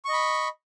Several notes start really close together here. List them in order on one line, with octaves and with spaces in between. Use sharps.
C#6 D#5 B5